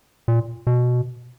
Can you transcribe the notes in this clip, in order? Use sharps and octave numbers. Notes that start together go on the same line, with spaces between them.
A#2
B2